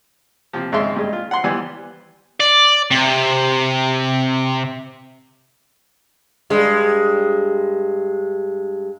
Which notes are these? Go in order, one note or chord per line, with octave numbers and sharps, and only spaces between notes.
C3 F3
G#1 G#2 C#3 E5 C6
G2 G#3
F4
F#5 C6
E3 G3 B3 G#5
D5
C3
G2 G#3